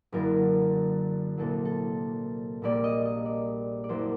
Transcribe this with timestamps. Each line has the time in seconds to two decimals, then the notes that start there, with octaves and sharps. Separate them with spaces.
0.12 F#1 F#2 D3 A#4
1.38 C2 A#2 F#3 A#3 A4
1.65 A4
2.62 A#1 A#2 G3 A#3 D5
2.84 D#5
3.05 D#5
3.26 D5
3.84 D5
3.89 F#1 F#2 F#3 A#3 C5